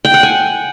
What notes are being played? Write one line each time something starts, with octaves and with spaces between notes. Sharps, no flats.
G5
F#5
G#5